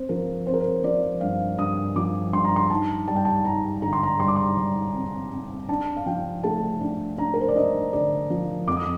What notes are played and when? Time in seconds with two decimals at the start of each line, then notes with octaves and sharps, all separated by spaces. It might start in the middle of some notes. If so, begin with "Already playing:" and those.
Already playing: C4 C5
0.09 F3 A#4
0.47 C4 C5
0.53 A#4
0.60 C5
0.84 F3 D5
1.21 G2 F5
1.58 G2 D#6
1.96 F3 D6
2.33 G2 C6
2.44 A#5
2.56 C6
2.70 D#4 A5
3.08 G3 A5
3.16 G5
3.25 A5
3.45 D#4 A#5
3.82 D3 A#5
3.93 C6
4.03 A#5
4.20 G3 C6
4.28 D6
4.36 C6
4.57 G3
4.94 C4
5.32 C4
5.68 D4 A5
5.97 F5
6.06 F3 G5
6.43 A3 A5
6.81 D4
7.18 D4 A#5
7.34 A#4
7.41 C5
7.48 D5
7.56 D4 D#5
7.93 D3 D5
8.30 F3
8.68 F2 D6
8.77 D#6